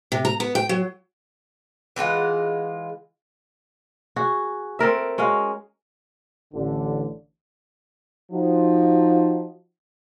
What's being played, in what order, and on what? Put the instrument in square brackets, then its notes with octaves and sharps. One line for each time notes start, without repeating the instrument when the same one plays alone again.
[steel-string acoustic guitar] C3
A#5
B3
G5
F#3
[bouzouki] E3 G#3 F4 F#5
[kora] F#4 G#4
C4 A4 A#4 E5
G#3 C#4 F#4 F5
[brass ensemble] A1 D3
[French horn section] F3 D#4 F#4